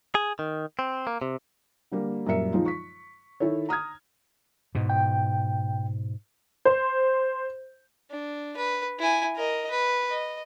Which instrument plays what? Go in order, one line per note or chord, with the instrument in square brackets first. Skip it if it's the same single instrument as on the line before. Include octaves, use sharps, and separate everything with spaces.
[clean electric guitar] G#4
D#3
C4
A#3
C3
[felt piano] D3 G3 A#3
F#2 A#2 G3 A#4 E5 C#7
D#3 F3 G#3 D#4 F4
C#6 B6
D#3 E4 A4 C#5
A#5 D#6 F6 G#6
[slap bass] G#2 B2
[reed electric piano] G5
[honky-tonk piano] C5
[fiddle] D4
B4
E4 G#5
A#4 D#5
B4
D#5